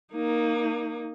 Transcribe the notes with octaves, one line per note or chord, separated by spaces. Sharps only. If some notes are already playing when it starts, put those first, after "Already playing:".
A#3 D#4